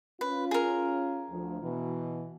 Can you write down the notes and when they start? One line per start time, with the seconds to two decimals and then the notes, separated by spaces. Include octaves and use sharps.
0.21 C#4 F4 B4
0.51 G#4 A#4
1.30 D2 F3
1.62 B2 E3